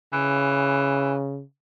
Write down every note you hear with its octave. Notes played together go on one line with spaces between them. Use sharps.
C#3 E3